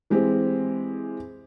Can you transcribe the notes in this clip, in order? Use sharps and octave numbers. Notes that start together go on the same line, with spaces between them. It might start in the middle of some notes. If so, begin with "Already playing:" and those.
E3 G#3 C4 G4